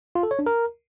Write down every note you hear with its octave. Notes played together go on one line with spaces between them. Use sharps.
F4
A4
C#5
D4
A#4